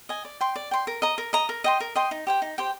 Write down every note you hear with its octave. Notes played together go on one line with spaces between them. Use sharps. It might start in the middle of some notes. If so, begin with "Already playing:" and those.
D#5 G#5
D5
G5 C6
D5
G5 C6
A#4
D#5 A#5
A#4
D#5 A#5
A#4
D#5 G5 C6
A#4
D#5 G5 C6
D#4
G4 C5 G5
D#4
G4 C5 G5